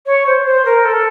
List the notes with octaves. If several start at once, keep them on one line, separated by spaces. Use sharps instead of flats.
C#5
C5
C5
A#4
A4